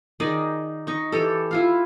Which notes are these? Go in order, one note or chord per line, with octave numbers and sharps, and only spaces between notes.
D#3 D#4 G#4 D5
D#4 C#6
E3 G4 A4
E4 F4 F5